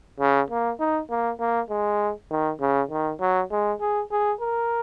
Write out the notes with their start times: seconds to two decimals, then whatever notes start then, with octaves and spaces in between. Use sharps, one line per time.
0.20 C#3
0.50 A#3
0.80 D#4
1.10 A#3
1.40 A#3
1.70 G#3
2.31 D#3
2.61 C#3
2.91 D#3
3.21 F#3
3.52 G#3
3.81 G#4
4.11 G#4
4.41 A#4